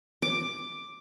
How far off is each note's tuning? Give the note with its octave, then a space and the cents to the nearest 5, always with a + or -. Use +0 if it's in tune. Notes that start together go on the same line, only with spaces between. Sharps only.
D6 +5